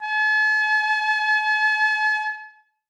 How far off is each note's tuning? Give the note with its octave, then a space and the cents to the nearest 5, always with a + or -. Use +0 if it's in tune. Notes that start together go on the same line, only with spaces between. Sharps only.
A5 -45